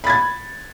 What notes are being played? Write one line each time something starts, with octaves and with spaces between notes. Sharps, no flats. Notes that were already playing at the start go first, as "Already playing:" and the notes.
B5 G#6 A6